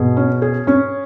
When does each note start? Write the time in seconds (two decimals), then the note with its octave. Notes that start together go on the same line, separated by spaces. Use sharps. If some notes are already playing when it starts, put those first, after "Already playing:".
Already playing: B2 G#4
0.17 C#4
0.42 G#4
0.67 C#4